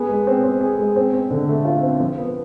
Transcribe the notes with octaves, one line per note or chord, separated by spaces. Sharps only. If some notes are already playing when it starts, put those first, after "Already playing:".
Already playing: B3 G#4
G#3
C4
C4
G#4
G#3
C4
C4
D3
A3
F4
C4
F3
B3